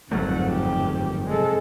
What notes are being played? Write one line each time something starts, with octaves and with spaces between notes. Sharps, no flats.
G1 F2 G#2 D#3 F#3 A3 F#5
G4
C3 G#3 A4